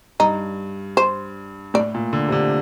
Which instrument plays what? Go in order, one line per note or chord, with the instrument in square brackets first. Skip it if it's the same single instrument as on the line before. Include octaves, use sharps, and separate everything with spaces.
[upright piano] G2 [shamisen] D#4
[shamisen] C5
[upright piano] A2 [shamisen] D5
[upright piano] A#2
D3
C3
D3